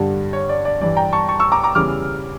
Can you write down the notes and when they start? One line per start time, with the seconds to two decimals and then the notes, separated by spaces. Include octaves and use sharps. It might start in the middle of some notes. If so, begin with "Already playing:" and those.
Already playing: G2 D3 G3
0.33 C#5
0.49 D5
0.65 D5
0.81 G2 E3 G3 D5
0.96 G5 A#5
1.13 A5 C#6
1.29 A5 C#6
1.40 C#6 E6
1.52 A#5 D6
1.64 A#5 D6
1.75 E2 C#3 E3 G3 D6 F6